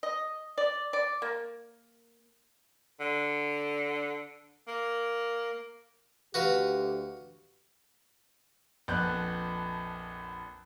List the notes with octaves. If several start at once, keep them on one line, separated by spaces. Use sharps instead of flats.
D#5
D5
D5
A#3
D3
A#3
D2 D3 F#4 G4 B4 F5
A#1 F2 B3 F#6 G6